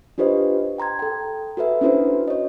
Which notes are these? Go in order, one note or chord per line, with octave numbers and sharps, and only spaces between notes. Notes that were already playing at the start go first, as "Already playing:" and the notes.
D4 F4 G4 B4 C5 D#5
G5 A#5 C6 G#6
A4 G5
F#4 A4 B4 E5
C#4 D4 E4 F#4 B4 C5
C#5 D#5